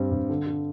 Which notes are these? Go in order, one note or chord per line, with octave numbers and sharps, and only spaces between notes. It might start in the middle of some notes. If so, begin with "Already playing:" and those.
Already playing: G2 G3 C4
G2
D3
D3